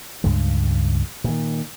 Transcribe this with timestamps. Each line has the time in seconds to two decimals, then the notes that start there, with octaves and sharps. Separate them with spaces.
0.24 C#2 G2 G#3
1.24 A#2 D#3